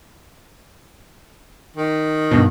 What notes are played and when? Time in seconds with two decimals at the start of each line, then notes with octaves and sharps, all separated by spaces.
1.76 D#3
2.31 G2 B2